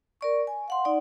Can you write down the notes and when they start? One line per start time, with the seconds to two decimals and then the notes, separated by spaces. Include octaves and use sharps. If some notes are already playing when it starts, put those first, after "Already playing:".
0.21 A#4 D5 C#6
0.47 G#5
0.68 F5 F#5 C6
0.85 D#4 D5 F#5